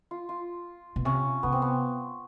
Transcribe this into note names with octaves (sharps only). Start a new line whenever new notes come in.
F4
F4
B2
C3 C#4
C3 B3
C4
B3